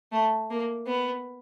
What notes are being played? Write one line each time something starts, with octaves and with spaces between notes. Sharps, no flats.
A3
A#3
B3